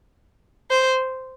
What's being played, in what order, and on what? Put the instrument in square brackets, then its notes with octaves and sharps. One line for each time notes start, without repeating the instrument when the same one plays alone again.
[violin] C5